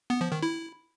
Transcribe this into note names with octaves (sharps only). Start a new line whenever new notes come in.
B3
F3
D#3
E4